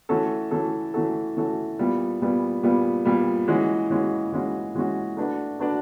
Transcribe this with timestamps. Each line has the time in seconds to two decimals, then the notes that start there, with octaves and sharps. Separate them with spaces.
0.09 E3 A3 C#4 F#4 A4
0.51 E3 A3 C#4 F#4 A4
0.94 E3 A3 C#4 F#4 A4
1.37 E3 A3 C#4 F#4 A4
1.79 A#2 G3 B3
2.21 A#2 G3 B3
2.63 A#2 G3 B3
3.05 A#2 G3 B3
3.48 E3 G#3 C#4 F#4
3.90 E3 G#3 C#4 F#4
4.32 E3 G#3 C#4 F#4
4.75 E3 G#3 C#4 F#4
5.17 A3 D4 F#4 B4 D5
5.59 A3 D4 F#4 B4 D5